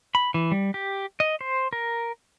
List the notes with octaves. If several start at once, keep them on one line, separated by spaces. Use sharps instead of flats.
B5
E3
G3
G4
D#5
C5
A#4